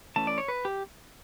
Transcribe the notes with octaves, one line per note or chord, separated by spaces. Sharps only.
E3 A3 C#4 A5
D5
C#5
B4
G4